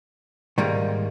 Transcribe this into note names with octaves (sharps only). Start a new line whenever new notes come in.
G#2 D#3 G3 A#3 D#4